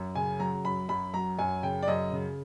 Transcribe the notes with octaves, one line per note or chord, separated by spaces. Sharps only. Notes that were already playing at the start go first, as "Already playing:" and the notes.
Already playing: F#2
C#3 G#5
F#3 A#5
F#2 B5
F#2 B5
F#3 A#5
F#2 G#5
C#3 G5
D5
F#2 D#5
C#3